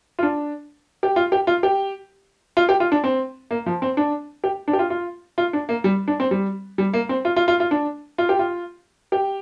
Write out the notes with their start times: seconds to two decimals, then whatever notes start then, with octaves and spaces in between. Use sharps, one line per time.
0.19 F4
0.23 D4
1.03 G4
1.16 F4
1.32 G4
1.47 F4
1.63 G4
2.57 F4
2.69 G4
2.80 F4
2.92 D4
3.04 C4
3.51 A#3
3.66 F3
3.82 C4
3.97 D4
4.44 G4
4.68 D4
4.73 G4
4.79 F4
4.90 F4
5.38 F4
5.53 D4
5.69 A#3
5.84 G3
6.08 D4
6.20 C4
6.31 G3
6.78 G3
6.94 A#3
7.09 C4
7.25 F4
7.36 F4
7.48 F4
7.60 F4
7.71 D4
8.18 F4
8.29 G4
8.39 F4
9.12 G4